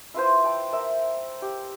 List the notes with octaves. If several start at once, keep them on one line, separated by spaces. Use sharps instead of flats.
E4 F4 B4 C5
G5 A5
A#4 E5
G4